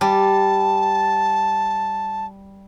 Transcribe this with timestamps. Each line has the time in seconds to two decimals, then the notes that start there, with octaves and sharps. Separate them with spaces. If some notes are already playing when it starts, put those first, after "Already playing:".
0.01 G3 A5